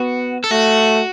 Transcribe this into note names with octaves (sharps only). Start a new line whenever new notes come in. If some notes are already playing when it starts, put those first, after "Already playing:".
Already playing: B3 F#4
A4
A3 F#4